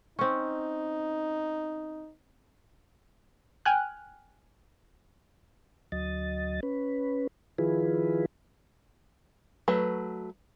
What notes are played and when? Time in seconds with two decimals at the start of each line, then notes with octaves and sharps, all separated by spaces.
0.19 C4 C#4 D#4
3.65 G5 G#5 F6 F#6
5.92 D2 F#3 D#5 A6
6.63 C#4 B4
7.58 D#3 F3 E4 F4 G#4 B4
9.68 F#3 A3 B4